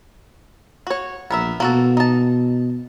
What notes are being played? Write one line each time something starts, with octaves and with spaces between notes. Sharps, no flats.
F#4 C#5
A#1 B3 A#4 E5
B2 A#3 F#4 A4
D#4 A5